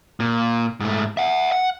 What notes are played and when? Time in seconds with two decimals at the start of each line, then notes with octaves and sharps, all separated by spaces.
0.20 A#2
0.80 G#2 A3
1.17 E5 F#5
1.52 F#5